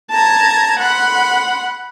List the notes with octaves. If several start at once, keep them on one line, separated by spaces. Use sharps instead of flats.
A5 A#5 G#6
F#5 B5 C6